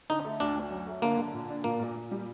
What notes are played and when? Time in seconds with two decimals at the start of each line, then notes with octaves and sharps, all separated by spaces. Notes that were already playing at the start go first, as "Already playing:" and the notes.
0.10 D3 D#4
0.25 A3
0.40 D2 D4
0.55 D2
0.71 F#2
0.87 A3
1.02 D3 A#3
1.18 D3
1.33 A#2
1.49 D4
1.64 A#2 A#3
1.79 A#2
1.95 A#2
2.11 G3